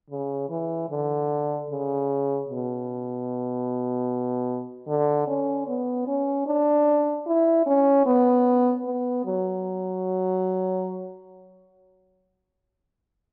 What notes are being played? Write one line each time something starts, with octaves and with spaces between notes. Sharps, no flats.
C#3
E3
D3
C#3
B2
D3
C#4
B3
C#4
D4
E4
C#4
B3
B3
F#3